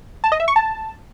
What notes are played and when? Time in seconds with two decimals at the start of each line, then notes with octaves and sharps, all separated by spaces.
0.24 A5
0.32 D#5
0.40 E5
0.48 C#6
0.56 A5